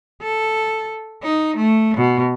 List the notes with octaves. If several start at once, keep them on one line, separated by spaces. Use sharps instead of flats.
A4
D#4
A3
B2